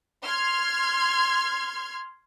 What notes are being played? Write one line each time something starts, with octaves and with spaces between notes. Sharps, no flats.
C6 F6 G#6